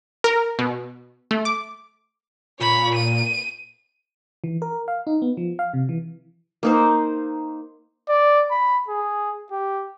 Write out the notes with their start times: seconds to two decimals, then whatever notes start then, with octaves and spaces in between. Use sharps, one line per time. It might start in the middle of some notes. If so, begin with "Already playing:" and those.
0.24 A#4
0.59 B2
1.31 A3
1.45 D6
2.60 A#2 C#5 B5
2.95 D#7
4.44 E3
4.62 A#4
4.88 F5
5.07 D#4
5.22 B3
5.37 F3
5.59 F5
5.74 C3
5.89 E3
6.63 A#3 D#4 C5
8.09 D5
8.51 B5
8.88 G#4
9.52 G4